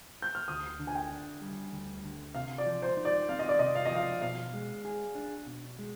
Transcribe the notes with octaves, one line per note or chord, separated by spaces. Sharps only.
G6
F6
D2 D#6
D3
G#5
G5
D4
G3
D2
D3
C3 F5
D5
F3
C5
D#4
D5
C4 F5
D#5
D5
C3 D#5
F5
D#5
F3 F5
B2 F5
G#3
G#4
D4
B2
G#3